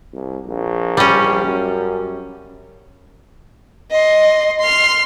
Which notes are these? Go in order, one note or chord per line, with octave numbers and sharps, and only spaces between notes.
C2
A#1
G3 C#4
F#2
D#5 C6
C6 F6